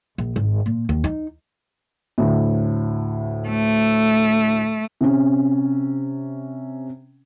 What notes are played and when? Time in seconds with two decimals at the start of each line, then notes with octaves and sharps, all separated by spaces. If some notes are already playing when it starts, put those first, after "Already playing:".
0.18 A#1
0.36 G#1
0.66 A#2
0.89 D#2
1.04 D#4
2.18 D2 A2
3.48 A3
5.01 C3 C#4